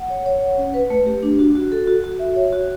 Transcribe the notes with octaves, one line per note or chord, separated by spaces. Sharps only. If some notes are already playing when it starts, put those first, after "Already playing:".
Already playing: F#5
C#5
C#5
F#5
C#4
B4
A3
G4
D4
F#4
F#4
A4
F#4
F#4
E5
C#5
F#4